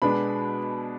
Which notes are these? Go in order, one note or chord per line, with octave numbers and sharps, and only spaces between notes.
B2 G#3 B3 D4 B5